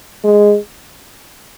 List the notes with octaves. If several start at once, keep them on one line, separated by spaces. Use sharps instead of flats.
G#3